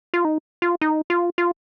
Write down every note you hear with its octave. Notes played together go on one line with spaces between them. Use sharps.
F4
D#4
F4
D#4
F4
F4